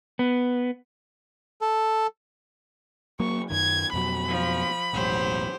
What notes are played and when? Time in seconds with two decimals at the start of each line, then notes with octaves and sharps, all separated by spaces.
0.19 B3
1.61 A4
3.20 F#3 A#3 C#6
3.50 F#2 D#3 G#6
3.93 F2 B2 F#3 B5
4.28 F3
4.93 E1 A1 F#3 G4 C5